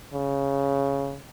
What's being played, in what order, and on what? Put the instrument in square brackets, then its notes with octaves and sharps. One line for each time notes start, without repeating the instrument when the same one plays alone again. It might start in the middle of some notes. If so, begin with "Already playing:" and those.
[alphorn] C#3